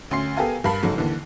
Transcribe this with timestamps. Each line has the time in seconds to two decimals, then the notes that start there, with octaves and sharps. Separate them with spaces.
0.11 D2 C#4 C6 C7
0.37 B3 G4 A4 A#4 F5 G#5
0.64 G2 A#4 F5 A5 B5 C7
0.83 F#1 G#2 F#3 A4
0.96 D#2 D3 E3